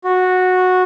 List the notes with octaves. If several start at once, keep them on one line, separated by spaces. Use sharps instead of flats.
F#4